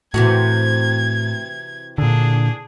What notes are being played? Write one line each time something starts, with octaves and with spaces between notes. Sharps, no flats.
A2 C3 E3 F#4 G#6
A#2 D3 D4 G#4